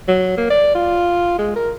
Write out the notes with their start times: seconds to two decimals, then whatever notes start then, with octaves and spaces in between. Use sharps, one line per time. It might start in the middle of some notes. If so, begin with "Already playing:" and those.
0.08 F#3
0.38 A#3
0.50 D5
0.75 F4
1.39 G#3
1.56 A#4